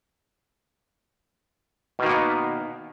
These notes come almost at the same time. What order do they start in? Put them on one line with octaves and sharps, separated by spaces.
B2 D#3 A#3 B3